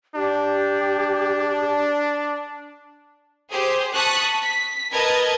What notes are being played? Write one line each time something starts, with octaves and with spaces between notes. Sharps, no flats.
D4 G4
G4 G#4 C5
A5 C#6 D#6 F#6 B6
B6
A#4 B4 D#5 A5 G#6